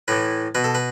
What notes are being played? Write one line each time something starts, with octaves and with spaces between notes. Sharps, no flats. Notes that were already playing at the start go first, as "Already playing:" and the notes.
A2 E3 B4
B2 B4
A4
B4